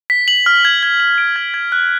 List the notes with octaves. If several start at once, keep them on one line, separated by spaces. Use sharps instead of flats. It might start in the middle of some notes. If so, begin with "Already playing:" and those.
B6
F#7
F6
G#6
G#6
F#7
D7
G#6
G#6
F#6